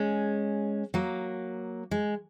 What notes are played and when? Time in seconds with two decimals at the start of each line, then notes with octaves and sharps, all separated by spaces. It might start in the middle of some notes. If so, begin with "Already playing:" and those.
Already playing: G#3 C#4
0.94 F#3 A#3
1.91 G#3